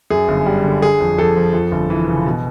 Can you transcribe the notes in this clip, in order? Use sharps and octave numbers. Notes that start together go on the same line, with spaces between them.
F#2 G#4
G1
G3
D3
D3 G#4
F2
F2 A4
F3
F2
G1
E3
C#3
B2